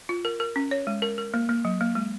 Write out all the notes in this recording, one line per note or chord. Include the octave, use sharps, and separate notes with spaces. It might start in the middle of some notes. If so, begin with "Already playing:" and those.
F4
A#4
A#4
C#4
C#5
G#3
A#4
A#4
A#3
A#3
F#3
A#3
G#3